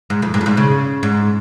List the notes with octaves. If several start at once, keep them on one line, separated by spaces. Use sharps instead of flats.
G#2
F2
G#2
F2
G#2
C#3
G#2